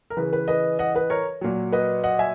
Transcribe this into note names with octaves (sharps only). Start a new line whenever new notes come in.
A#4
C#3 E3 B4
B4
B4 D#5
D#5 F#5
B4 D#5
A#4 C#5
A#2 F#3
B4 D#5
D#5 F#5
E5 G#5